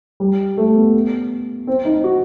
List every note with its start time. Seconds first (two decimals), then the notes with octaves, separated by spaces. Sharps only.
0.20 G3
0.57 A3
0.75 B3
1.67 C4
1.85 D#4
2.04 F#4